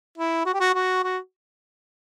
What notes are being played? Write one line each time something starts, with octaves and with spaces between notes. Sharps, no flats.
E4
F#4
G4
F#4
F#4
F#4